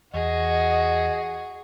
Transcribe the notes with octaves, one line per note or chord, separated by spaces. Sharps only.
E2 F#4 G#4 D#5